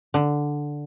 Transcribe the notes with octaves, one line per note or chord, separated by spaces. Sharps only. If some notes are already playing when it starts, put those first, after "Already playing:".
D3